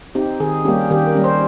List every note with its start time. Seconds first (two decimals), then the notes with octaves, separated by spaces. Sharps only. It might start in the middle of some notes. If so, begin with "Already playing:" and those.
0.15 C4 D#4 G4
0.40 D#3 G#4
0.65 G3 A#3 C#4 G4
0.90 D#3 G4
1.07 A#4
1.15 G3 A#3 C#4
1.24 C5